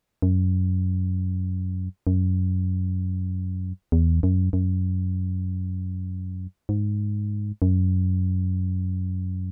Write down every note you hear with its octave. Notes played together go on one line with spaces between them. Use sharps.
F#2
F#2
E2
F#2
F#2
G#2
F#2